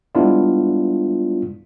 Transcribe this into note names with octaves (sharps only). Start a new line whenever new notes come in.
G3 G#3 B3 D4 E4 F4